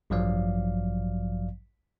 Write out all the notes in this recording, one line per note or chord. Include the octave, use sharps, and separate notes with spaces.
A1 G2 F3 F#3 D5 F5